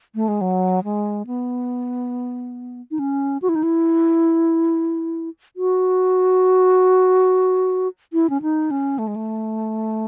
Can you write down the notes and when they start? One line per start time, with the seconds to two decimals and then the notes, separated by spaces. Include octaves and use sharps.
0.15 A3
0.28 G#3
0.41 F#3
0.84 G#3
1.27 B3
2.91 D#4
2.99 C#4
3.42 F#4
3.49 E4
3.55 D#4
3.63 E4
5.56 F#4
8.13 E4
8.30 C#4
8.42 D#4
8.71 C#4
8.98 A3
9.07 G#3
9.16 A3